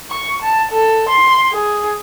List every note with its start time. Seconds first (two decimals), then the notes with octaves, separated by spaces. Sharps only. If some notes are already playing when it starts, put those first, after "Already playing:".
0.11 C#6
0.42 A5
0.72 A4
1.09 C6
1.52 G#4